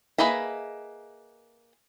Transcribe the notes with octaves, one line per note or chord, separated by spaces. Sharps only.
A#3 G#4 B4 D#5 E5